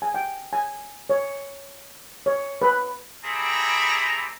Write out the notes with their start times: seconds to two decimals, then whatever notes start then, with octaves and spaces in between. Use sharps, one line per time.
0.02 G#5
0.14 G5
0.53 G#5
1.10 C#5
2.26 C#5
2.62 B4
3.24 G3 C4 E4 G#4 A4 A#5